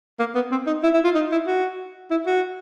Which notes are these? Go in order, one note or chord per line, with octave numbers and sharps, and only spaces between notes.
A#3
B3
C4
D#4
E4
E4
F4
D#4
E4
F#4
E4
F#4